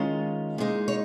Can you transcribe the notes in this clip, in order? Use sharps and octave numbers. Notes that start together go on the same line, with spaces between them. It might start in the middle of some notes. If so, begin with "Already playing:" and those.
Already playing: D#3 G#3 C#4 F4
A#2 G#3 D#4
C#5